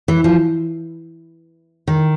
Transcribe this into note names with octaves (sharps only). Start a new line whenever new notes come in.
E3
F3
D#3